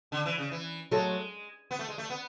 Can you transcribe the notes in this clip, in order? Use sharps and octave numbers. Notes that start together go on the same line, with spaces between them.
D3
E3
C#3
E3
F#3 G#3 A3
B3
A3
G#3
A3
B3